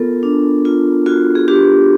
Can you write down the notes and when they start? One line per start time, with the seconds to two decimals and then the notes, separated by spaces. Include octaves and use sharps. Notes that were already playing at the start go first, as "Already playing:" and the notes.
Already playing: B3 F4 A4 A#4
0.23 D4
0.65 F4
1.06 F4 F#4
1.35 G#4
1.48 D4 G4